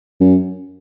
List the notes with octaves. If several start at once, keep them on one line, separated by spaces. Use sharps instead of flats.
F#2